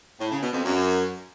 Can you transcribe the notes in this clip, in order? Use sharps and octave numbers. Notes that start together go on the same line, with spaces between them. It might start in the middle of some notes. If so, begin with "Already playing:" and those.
A2
C#3
B2
F2
F#2